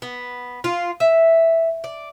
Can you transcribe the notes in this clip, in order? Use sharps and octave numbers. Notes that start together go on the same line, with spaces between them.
B3
F4
E5
D5